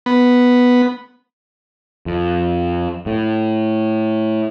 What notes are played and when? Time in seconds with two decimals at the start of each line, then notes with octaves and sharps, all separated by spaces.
0.06 B3
2.06 F2
3.06 A2